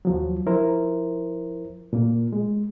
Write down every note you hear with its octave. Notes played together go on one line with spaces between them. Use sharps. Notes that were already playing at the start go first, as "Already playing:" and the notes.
D#2 F3 F#3
F3 E4 A#4 C5
A#2 A#3
G#3